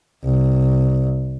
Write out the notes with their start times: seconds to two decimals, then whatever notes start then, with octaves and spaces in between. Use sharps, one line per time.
0.24 C2